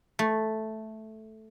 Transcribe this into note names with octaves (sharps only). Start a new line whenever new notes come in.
A3